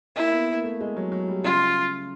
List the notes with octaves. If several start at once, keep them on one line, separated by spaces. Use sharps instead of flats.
A#3 E4
B3
A#3
A3
G#3
F#3
F#3
G3
C#3 F4